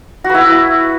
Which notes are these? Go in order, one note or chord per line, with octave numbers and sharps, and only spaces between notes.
F#4
B4
E4